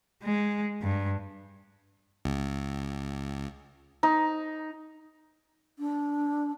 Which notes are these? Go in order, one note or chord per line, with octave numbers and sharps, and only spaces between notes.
G#3
G2
C#2
D#4
D4